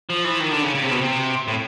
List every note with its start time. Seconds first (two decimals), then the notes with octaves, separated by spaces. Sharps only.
0.10 F3
0.24 E3
0.40 D#3
0.51 D3
0.62 C#3
0.75 C#3
0.83 C3
0.92 B2
1.02 C3
1.48 A2